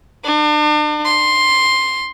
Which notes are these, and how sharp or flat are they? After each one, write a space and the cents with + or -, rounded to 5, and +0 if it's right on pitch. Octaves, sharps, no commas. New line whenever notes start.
D4 +40
C6 +5